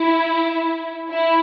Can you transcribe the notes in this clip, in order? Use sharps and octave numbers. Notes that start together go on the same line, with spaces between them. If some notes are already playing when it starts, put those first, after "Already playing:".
Already playing: E4
E4